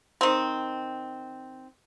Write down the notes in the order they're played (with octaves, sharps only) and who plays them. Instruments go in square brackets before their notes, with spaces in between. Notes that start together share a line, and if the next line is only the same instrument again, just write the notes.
[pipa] D#3 C4